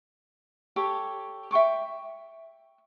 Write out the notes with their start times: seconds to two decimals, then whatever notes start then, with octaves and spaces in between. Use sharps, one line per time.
0.76 G4 A4 C#5
1.51 E5 G5 C#6 D6